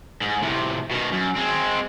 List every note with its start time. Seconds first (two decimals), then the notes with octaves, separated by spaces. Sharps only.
0.21 G#2
0.42 A2 C3
0.91 B2 D#3
1.12 F#2
1.36 G#3 C4